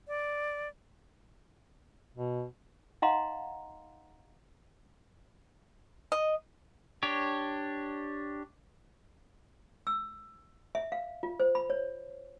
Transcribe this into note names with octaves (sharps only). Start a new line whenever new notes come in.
D5
B2
D#4 D#5 F5 F#5 A#5 C6
D#5
D4 G4 C#5
E6
E5
F5
F4
C5
B5
C#5